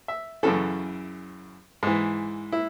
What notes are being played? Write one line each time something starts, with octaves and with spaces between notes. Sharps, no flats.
E5
F#2 C#3 E3 A4
G#2 E3
E4